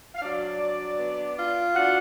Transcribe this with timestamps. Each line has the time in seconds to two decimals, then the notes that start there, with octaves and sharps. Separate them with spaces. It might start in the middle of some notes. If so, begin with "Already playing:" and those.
0.15 F5
0.21 F#3 D4 D5
0.60 F#3
0.99 B3
1.37 F4
1.75 D4 F#4 F#5